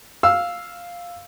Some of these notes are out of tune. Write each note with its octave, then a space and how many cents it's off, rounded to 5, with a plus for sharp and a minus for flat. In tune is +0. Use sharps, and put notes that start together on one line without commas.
F5 +0 E6 +0